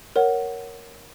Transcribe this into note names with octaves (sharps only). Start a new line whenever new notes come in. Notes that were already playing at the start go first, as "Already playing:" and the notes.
A#4 C#5 F#5